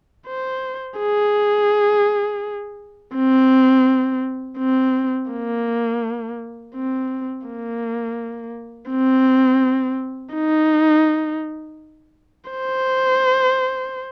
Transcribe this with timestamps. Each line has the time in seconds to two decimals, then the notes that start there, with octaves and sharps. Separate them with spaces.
0.27 C5
0.99 G#4
3.15 C4
4.59 C4
5.31 A#3
6.75 C4
7.47 A#3
8.91 C4
10.35 D#4
12.50 C5